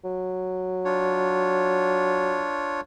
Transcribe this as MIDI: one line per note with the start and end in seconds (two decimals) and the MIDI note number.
0.04 2.44 54
0.85 2.81 62
0.85 2.81 65
0.85 2.81 73